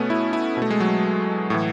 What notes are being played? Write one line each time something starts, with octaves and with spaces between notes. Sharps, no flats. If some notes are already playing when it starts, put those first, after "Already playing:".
Already playing: B2 A3 B3 C#4
E4
E4
B2 A3
G#3
F#3
A2 E3